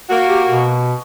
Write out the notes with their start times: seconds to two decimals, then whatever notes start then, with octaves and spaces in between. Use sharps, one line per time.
0.10 A#3 F#4
0.28 G4
0.48 B2